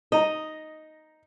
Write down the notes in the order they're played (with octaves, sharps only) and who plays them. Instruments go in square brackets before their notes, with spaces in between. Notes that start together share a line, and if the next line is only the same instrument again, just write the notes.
[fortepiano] D#4 A#5 [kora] D#5